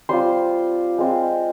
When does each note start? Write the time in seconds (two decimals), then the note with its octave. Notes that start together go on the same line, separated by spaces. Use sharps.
0.09 G3 C4 F4 C5 C6
0.98 G#3 C4 F4